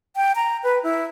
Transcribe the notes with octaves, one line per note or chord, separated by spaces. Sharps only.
G5
A#5
B4
E4